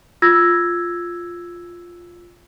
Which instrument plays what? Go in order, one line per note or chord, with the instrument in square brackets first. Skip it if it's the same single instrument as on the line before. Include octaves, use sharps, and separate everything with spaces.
[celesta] F4 E6 G#6 A#6